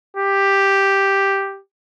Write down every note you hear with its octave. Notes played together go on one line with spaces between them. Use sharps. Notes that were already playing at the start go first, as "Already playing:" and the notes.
G4